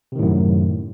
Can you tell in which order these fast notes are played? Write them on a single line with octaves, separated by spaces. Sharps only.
C3 D#3 A2 F#2